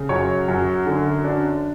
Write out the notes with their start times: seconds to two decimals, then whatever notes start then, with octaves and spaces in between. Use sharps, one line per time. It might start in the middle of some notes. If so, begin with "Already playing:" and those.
Already playing: C#3
0.09 F#2 C#5
0.48 F#2
0.86 D3
1.24 D4